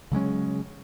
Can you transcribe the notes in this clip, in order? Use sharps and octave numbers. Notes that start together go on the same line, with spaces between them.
C#3 F#3 G#3 C#4